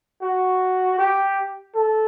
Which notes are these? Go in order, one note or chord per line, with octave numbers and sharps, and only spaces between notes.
F#4
G4
A4